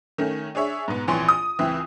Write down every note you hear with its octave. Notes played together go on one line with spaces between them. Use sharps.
D#3 A3 C#4
D4 G#4 C#5 E5
G#2 B2 B3
A#1 E3 C4 C#5 G#5 C6
D#6
C#2 E3 C4 E5